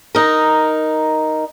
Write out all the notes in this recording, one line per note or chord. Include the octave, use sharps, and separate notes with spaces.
D#4 A#4